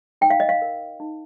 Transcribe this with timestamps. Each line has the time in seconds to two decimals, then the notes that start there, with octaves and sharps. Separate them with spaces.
0.21 D#4 G5
0.30 F5
0.40 D#5
0.49 F5
0.62 A#4
1.00 D#4